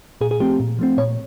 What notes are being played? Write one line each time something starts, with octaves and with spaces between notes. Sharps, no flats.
A#2 G#4
G#4
F3 A3 C4 G4
A#2
F3 A3 C4
A#2 C#5